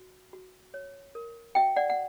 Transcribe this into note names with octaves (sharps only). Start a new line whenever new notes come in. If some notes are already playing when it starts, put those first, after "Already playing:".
Already playing: F#4
F#4
C#5
A#4
F#4 E5 G5
D5 F#5
F#5